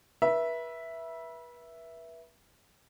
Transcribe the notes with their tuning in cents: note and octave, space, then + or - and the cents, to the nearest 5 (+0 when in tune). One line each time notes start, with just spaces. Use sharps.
B4 -30 E5 +0